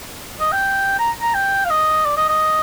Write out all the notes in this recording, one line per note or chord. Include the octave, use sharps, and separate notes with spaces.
D#5
G5
A#5
A#5
G5
F5
D#5
D5
D#5
D#5